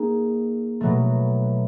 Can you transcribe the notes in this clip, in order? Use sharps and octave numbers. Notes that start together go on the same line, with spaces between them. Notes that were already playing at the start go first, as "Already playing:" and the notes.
Already playing: A#3 D#4 G#4
B2 F#3 A3